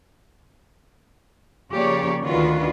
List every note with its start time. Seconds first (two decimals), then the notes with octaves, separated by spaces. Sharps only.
1.72 C#3 F3 A#3 G4 C#5 D5
2.25 D2 D#3 D4 F4 F#4 B4